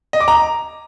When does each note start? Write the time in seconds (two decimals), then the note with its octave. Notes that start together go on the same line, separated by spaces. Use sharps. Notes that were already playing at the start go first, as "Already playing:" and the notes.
0.13 D#5
0.21 D6
0.28 A#5